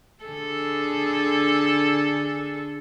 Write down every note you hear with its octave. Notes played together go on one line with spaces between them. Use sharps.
D3 G#4 A4